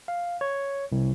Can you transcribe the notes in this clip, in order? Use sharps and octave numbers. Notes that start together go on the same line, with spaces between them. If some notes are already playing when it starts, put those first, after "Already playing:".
F5
C#5
C2